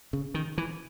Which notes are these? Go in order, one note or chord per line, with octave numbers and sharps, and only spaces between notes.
C#3
D#3
E3